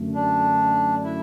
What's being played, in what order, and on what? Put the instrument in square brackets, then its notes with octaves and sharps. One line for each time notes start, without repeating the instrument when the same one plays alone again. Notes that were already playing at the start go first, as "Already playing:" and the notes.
Already playing: [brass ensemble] F#2 D3 A3
[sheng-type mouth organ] D4
E4